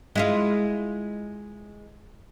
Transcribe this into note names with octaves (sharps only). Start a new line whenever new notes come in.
G#3 E4 F4